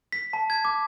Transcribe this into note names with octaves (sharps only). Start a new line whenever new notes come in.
B6
A5
G#6
D6